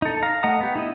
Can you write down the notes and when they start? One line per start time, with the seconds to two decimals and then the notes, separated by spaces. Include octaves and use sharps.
0.02 D#4 A4
0.23 F5 A#5
0.43 A3 D#5 F#5 A#5 D#6
0.61 B3 G4
0.76 D#4 E4 D#5